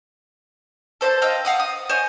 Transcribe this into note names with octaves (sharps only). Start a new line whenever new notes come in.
A4 C5 E5 A5
D#5 F5 G5 E6
F5 F#5 D#6
D#6
C5 C#5 D#5 G#5